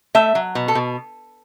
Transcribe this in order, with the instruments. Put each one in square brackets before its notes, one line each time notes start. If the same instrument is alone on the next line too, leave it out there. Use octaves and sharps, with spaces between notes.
[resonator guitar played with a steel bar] A3 E5
F#3
B2
A4
B2